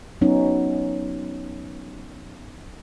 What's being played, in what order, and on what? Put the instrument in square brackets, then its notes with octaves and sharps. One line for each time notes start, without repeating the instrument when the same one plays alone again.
[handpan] F#3 B3 C#4 D#4